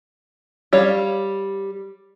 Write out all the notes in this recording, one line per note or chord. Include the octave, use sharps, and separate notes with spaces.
G3 C#5 F5